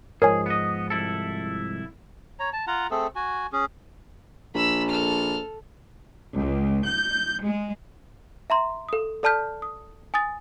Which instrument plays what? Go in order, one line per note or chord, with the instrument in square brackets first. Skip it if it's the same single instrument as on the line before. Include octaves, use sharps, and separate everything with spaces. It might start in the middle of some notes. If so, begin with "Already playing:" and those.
[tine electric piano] G#2 F3 G#3 [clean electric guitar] G#4 [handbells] A#4 C#5 G#5
[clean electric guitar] B3 D#5
C2 E4 A4
[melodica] C#5 A#5
A5
F4 F#5 A#5
A3 C4 G#4 A4
F#4 G#5
C#4 G#4
[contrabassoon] A#1 [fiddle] B5 E6
[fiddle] A4 F6
[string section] C#2
G6
G#3
[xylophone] E5 A#5 C6
A4 D#6
A4 D5 A5 F6 G6 B6
D#6
G#5 D#6 A6